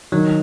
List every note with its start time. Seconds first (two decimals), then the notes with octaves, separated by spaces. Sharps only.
0.12 D#3 F#3